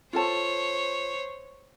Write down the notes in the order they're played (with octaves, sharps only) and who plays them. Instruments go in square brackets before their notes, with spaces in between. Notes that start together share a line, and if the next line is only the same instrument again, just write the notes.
[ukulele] F4 A4 A5 [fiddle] C5 C#5